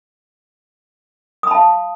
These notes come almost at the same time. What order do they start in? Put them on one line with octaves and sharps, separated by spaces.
D#6 B5 A5 F5